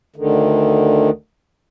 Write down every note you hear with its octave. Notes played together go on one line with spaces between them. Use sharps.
D2 D3 D#3